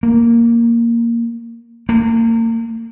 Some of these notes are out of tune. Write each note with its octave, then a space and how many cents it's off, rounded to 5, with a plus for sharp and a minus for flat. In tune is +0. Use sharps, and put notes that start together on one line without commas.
A#3 +0
A#3 -35